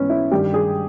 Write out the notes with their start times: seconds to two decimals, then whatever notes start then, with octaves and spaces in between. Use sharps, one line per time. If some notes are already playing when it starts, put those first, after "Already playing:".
Already playing: G#2 E3 B3 C#4
0.10 E4
0.31 G2 D#3 G4
0.54 G#4